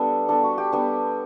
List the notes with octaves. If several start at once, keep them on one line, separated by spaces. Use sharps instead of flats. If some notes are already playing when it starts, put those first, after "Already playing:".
Already playing: G3 B3 D4 A4
G3 B3 D4 A4
F#4
G4
G3 B3 D4